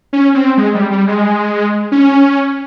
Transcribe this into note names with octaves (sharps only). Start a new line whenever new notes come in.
C#4
C4
G#3
G3
G3
G#3
C#4